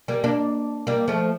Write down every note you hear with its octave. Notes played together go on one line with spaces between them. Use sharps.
G3 A#3
A#3 D4
G3 A#3
F3 A3